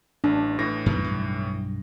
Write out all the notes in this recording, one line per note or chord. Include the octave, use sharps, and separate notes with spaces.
A1 D4
A2 E3 A#6
F#2 D#3 B3
B1 G2